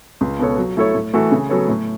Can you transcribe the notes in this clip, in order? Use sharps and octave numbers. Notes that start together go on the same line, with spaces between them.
C#2
B2 B3 A4 C#5
F#3
A3 E4 A4 C#5
A2
E3 A3 F#4 A4
C#3
F#3 B3 A4 C#5
A2